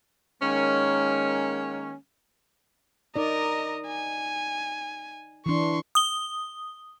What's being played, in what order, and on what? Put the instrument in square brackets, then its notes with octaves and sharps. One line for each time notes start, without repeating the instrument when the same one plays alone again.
[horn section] D#3 G#3 A#3 C#4
[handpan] D#4 D5 [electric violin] A#4 D#5
[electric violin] G#5
[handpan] E3 D4 [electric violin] C6 C#6
[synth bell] D#6 G7